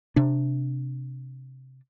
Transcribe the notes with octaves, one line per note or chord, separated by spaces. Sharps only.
C3 D4